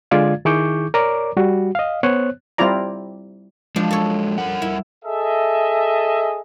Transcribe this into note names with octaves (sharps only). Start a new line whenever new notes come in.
D3 G#3 F4 D5 F5 G#6
D#3 E4 G#4 C#6 D6 G6
A#4 C#5 D5 A#5 D6
G3 F#4
D#5 F5
B3 C5 C#5 F#6
G3 C4 E4 F4 D5 A#5
F3 F#3 G#3 D4
A4 C#5
G3 A#4 F#5
E4
G#4 A4 D#5 E5